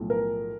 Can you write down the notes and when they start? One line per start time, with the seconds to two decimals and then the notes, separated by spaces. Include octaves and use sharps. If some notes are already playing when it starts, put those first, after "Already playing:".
Already playing: B1 A2 F3
0.10 A#4